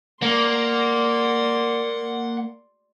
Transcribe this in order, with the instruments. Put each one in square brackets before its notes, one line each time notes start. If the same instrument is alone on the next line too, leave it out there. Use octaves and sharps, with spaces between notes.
[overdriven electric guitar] A#3 [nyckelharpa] D5 C6 [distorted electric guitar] F#5